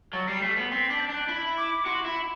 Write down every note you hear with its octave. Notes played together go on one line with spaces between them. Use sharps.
F#3 A6
G3 C7
A3 B6
B3
C4 B6
D4 B6
G6
D4 F#6
E4
D6
F#4 C6
E4 B5